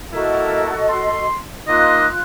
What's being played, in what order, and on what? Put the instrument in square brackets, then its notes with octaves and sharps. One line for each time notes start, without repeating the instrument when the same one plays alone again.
[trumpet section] A#3 E4 A#4 [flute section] F#4 A4 D#5
[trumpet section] C6
[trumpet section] A#3 D#4 [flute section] F4 C6 F#6 [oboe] D#5